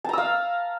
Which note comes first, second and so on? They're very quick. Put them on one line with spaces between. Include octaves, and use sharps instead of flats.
A5 A#5 E6 F5